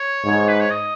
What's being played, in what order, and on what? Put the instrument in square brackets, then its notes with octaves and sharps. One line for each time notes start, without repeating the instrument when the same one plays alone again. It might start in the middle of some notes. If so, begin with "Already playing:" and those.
Already playing: [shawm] C#5
[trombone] G#2
[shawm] B4
C#5
D#5